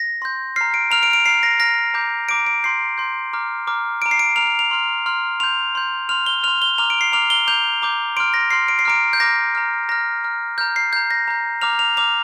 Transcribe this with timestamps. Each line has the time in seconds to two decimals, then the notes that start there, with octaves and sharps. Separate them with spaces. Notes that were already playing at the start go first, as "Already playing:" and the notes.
Already playing: A#6
0.22 C6 G6
0.56 A#5 F6 C7
0.74 D7
0.91 A#5 F6 F7
1.03 D7
1.13 D7
1.26 A#5 F6 C7
1.43 A#6
1.60 A#5 F6 A#6
1.94 A#5 D6 G6
2.29 A#5 D6 G6 D7
2.47 D7
2.64 C6 G6 C7
2.98 C6 G6
3.33 A#5 D6 F6
3.67 A#5 D6 F6
4.02 A#5 F6 D7
4.11 C7
4.19 D7
4.36 A#5 F6 F7
4.59 F7
4.71 C6 F6
5.06 C6 F6
5.40 C6 G6 F7
5.75 C6 G6
6.09 C6 F6 F7
6.26 G7
6.43 C6 F6 F7
6.62 G7
6.78 A#5 D6 F6 F7
6.90 D7
7.01 C7
7.12 A#5 D6 F6 F7
7.30 G7
7.47 A#5 D6 G6 F7
7.82 A#5 D6 G6
8.16 C6 F6 D7
8.34 A#6
8.51 C6 F6 C7
8.68 D7
8.79 C7
8.85 A#5 D6 F6 D7
9.13 G6
9.20 A#5 D6 F6 A#6
9.55 A#5 F6
9.89 A#5 F6 A#6
10.24 A#5 F6
10.58 A#5 F6 G6
10.76 C7
10.93 A#5 G6
11.11 A#6
11.28 A#5 G6
11.61 A#5 D6 F6 F7
11.79 F7
11.97 A#5 D6 F6 F7